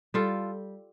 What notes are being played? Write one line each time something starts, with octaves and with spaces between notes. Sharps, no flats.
G3 F4 A4